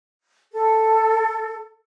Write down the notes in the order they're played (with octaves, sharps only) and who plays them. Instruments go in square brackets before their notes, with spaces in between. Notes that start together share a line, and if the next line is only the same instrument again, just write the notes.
[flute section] A4